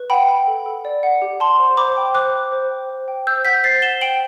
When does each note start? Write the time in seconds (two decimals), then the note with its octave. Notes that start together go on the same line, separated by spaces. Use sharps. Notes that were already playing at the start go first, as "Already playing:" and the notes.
Already playing: B4
0.10 F#5 G5 B5
0.29 G5
0.47 A4
0.66 A4
0.85 D5
1.03 F#5
1.22 G4
1.40 G4 A5 C6
1.59 C5
1.77 C5 B5 D6
1.97 G5
2.14 C5 D6 F#6
2.34 G5
2.52 C5
2.71 G5
2.89 C5
3.08 G5
3.27 C5 E6 G6
3.45 F#5 G6 B6
3.64 C5 A6 C7
3.82 F#5 E7 G7
4.01 G5 D7 F#7